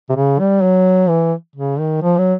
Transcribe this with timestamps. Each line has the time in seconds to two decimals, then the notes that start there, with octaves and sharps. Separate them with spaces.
0.10 C3
0.16 C#3
0.39 G3
0.63 F#3
1.09 E3
1.55 C#3
1.79 D#3
2.02 F3
2.18 F#3